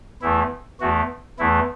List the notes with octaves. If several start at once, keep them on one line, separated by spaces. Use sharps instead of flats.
E2 E3 A3 E4
E2 E3 A3 F#4
E2 E3 A3 E4